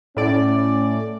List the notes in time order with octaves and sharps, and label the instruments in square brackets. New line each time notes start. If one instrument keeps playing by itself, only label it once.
[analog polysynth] A2 D5 [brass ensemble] C#4